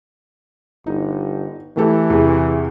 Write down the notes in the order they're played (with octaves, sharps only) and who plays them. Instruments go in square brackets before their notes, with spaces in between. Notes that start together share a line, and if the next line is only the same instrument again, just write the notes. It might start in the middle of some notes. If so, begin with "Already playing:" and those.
[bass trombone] G1 [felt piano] D#4
[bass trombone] E3 [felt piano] A3 G4 A4
[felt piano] E2 C3 G#4